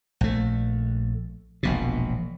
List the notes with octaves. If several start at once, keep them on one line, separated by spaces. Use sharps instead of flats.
A#1 A3
E1 A#1 B2